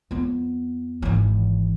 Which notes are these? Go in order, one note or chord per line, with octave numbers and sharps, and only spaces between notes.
F2 B3
G#1 E3